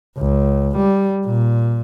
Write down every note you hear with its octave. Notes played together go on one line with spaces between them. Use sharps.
C#2
G3
A#2